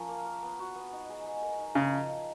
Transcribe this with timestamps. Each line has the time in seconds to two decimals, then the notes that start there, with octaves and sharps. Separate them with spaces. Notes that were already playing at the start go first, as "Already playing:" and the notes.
Already playing: F3 C#4 A#4
0.09 A#3
0.26 A#3
0.43 B3
0.60 F#4
0.76 B3
0.92 D#4
1.10 G#3
1.25 G#3
1.42 A#4
1.59 D#4
1.75 C#3 D#4
1.92 F3
2.09 D#4